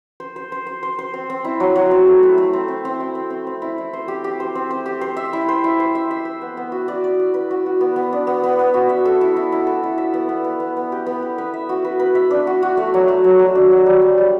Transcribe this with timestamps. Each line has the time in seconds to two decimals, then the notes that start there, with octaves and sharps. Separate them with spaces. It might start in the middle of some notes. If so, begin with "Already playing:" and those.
0.20 C5
0.36 C5
0.52 C5
0.67 C5
0.83 C5
0.99 C5
1.14 C4
1.30 C4
1.44 E4
1.60 F#3
1.76 F#3
1.91 C4
2.07 A3
2.23 E4
2.38 A3
2.53 C4
2.68 C4
2.85 C4
3.00 E4
3.15 C4
3.30 C4
3.47 C4
3.62 E4
3.78 E4
3.93 C5
4.08 G4
4.24 G4
4.40 C5
4.55 C4
4.71 C5
4.86 G4
5.01 C5
5.17 E5
5.33 E4
5.49 C5
5.64 E4
5.80 C5
5.95 E5
6.11 E5
6.25 C5
6.41 B3
6.57 B3
6.72 F#4
6.88 D5
7.04 D5
7.20 D5
7.34 B4
7.51 F#4
7.66 F#4
7.81 B3
7.96 B3
8.13 D4
8.27 B3
8.43 B3
8.59 B3
8.74 F#4
8.89 E5
9.05 A4
9.21 E4
9.36 E4
9.52 E4
9.67 A4
9.83 E4
9.98 E5
10.14 B3
10.29 B3
10.44 B3
10.60 B3
10.77 B3
10.92 G4
11.06 B3
11.22 G4
11.38 B4
11.54 E5
11.69 F#4
11.84 B4
12.00 B4
12.15 E5
12.31 D4
12.47 F#4
12.63 F#4
12.77 A3
12.94 F#3
13.08 A3
13.24 F#3
13.39 F#3
13.55 D4
13.71 F#3
13.86 G3
14.02 G3
14.18 G3